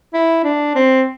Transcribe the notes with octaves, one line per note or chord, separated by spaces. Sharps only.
E4
D4
C4